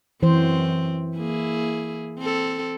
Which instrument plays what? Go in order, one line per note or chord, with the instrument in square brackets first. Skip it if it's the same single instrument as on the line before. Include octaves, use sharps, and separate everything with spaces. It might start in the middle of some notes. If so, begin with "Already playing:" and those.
[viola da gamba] F#2 C4 [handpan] E3 C5
[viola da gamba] A#3 E4 G#4
C4 A4